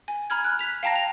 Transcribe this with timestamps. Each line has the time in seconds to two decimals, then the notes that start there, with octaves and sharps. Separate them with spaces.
0.08 G#5
0.30 A#5 B5 F6 G#6
0.44 F#6
0.59 B6 F7
0.83 F5 G5 A5 A#5 A#6
0.96 F7